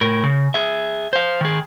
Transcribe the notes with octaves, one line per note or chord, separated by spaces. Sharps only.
A2 A#4
C#3
G#4 E5
C5 F5
D#3 G#4